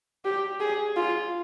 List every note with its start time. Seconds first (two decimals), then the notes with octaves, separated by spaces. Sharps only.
0.25 G4
0.60 G#4
0.96 F4